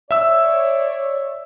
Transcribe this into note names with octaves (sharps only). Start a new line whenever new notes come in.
C#5 D5 E5 E6